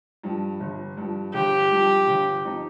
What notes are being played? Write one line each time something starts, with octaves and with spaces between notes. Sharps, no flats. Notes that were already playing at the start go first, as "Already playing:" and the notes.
G2 F3
G1
G2 F3
G1 G4
G2 F3
G1
F3 C4 D#4